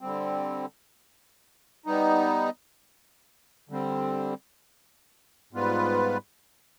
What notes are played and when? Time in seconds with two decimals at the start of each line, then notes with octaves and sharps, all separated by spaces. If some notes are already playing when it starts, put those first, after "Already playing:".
0.01 D3 G3 C4
1.86 G3 B3 D#4
3.69 D3 G3 C4
5.53 G#2 G3 B3 F4 B4